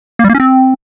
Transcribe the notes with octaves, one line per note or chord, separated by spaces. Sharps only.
A#3
G3
A#3
C#4
C4